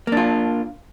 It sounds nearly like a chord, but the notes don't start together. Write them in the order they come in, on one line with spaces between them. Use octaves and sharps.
A#3 D4 F4